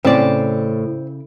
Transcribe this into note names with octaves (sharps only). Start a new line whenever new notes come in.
A2 C#3 C4 D5